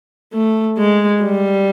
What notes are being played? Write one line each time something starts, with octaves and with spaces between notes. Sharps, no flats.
A3
G#3
G3